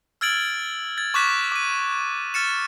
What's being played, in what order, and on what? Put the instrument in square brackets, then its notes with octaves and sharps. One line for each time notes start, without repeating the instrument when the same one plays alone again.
[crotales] E6 F6 G#6 A6 D7 F#7
G#6 A6
C#6 D6 F#6 B6 E7
D6 D#7
F6 A6 C#7 E7